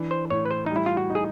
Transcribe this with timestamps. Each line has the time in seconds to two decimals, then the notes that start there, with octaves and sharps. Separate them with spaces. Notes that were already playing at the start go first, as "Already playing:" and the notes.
Already playing: E3 D4
0.11 C5
0.30 A2 C#5
0.46 B4
0.51 C5
0.66 G3 D#4
0.76 E4
0.86 F4
0.97 F#4
1.10 D#4
1.15 G#4